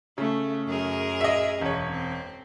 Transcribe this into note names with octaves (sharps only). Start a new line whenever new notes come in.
C#3 A3
F#2 G#4 A#4
D#5 E5
E1 C#4 C#5
C4